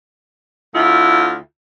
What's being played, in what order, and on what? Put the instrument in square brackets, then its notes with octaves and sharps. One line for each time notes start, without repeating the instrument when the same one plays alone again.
[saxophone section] D2 E4 F4